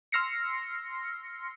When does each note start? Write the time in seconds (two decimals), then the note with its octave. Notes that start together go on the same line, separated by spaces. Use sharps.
0.12 C6 E6 F6 A#6 C7 C#7